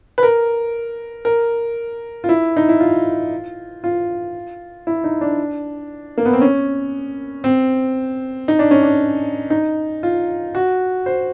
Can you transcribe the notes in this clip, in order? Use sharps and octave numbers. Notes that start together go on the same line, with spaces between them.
B4
A#4
A#4
F4
E4
D#4
E4
F4
F4
E4
D#4
D4
A#3
B3
C4
C#4
C4
D#4
D4
C#4
D4
D#4
F4
F#4
C5